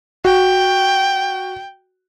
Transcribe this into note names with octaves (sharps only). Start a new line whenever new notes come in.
F#4 G5